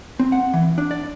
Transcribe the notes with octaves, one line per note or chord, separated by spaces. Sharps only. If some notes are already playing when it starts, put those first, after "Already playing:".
C4
F#5
E3
D4
D5